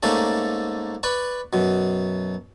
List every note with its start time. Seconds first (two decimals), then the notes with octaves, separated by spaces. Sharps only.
0.03 G#2 A3 A#3 C#4 A4 D5
1.03 B4 D5 B5 C#6
1.53 F#2 B2